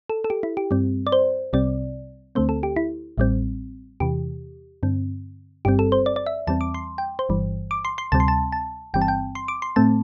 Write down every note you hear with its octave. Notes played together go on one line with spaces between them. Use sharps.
A4
A4
G4
E4
G4
G2 G3 C4
D5
C5
C2 C3 G3 C4 D5
D2 D3 A3 C4 C5
A4
G4
E4
A1 A2 G3 C4
E2 C3 E3 G4
G2 D3 C4
G1 G2 G3 C4 G4
A4
C5
D5
D5
E5
E2 E3 G3 C4 A5
D6
C6
G5
C5
G1 G2 E3 G3
D6
C6
C6
D2 C3 G3 C4 A5
C6
A5
A5
G1 G2 E3 G3 C4 G5
A5
G5
C6
D6
C6
A2 A3 C4 A5